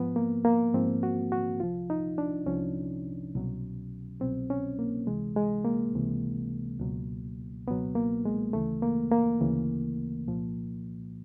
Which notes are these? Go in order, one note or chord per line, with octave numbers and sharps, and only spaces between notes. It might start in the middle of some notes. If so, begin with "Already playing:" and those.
Already playing: G#2 F3 B3
A#3
A#3
G#2 F3 C4
F#4
F#4
C2 C3 F3 F4
D#4
D4
C2 C3 F3 C#4
C2 B2 F#3
C2 B2 F#3 C4
C#4
A#3
C#2 C3 E3 G#3
G#3
A#3
C#2 C3 E3
C#2 B2 F#3
C#2 B2 F#3 B3
A#3
G#3
D2 C#3 E3 A3
A#3
A#3
D2 C#3 E3
C2 A#2 F3